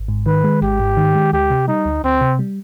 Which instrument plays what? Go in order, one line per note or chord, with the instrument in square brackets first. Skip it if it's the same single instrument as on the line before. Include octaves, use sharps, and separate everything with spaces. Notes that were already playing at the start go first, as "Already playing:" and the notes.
Already playing: [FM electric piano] G#1
G#2
[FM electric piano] D#3 [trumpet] B4
[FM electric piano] G#3
[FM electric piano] G#1 [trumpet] G4
[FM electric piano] G#2
D#3
G#3
[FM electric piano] D2 [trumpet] G4
[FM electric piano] C3
[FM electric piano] G3 [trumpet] D#4
[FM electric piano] D2
[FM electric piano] D2 [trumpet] C4
[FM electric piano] C3
G3